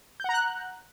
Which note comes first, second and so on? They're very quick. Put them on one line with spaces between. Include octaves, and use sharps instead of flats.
G6 F#5 A#5 F#6